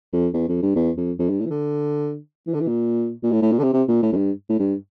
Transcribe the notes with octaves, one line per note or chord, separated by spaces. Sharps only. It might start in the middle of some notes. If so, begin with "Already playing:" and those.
F2
E2
F2
G2
E2
F2
F2
G2
A2
E3
D3
E3
D3
E3
A#2
A#2
A2
A2
A#2
D3
C3
C3
A#2
A2
F2
G2
A2
G2